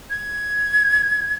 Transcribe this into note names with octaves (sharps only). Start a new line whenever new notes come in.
G#6